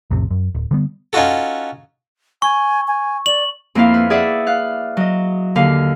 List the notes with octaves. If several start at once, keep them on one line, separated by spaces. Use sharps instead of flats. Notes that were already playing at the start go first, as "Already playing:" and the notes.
B1 F2 A2 C3
F#2
D1
D3 G3 B3
C#4 D#4 F4 F#4 A4
G#5 C#6
G#5
D5 F#7
F2 A#3 E4 F5
B4
G#4 D5 E5 F#5
F5 F#6
F#3 D#5
D#2 D3 F5